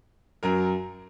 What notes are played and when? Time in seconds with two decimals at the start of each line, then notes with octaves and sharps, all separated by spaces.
0.43 F#2 F#3 A#4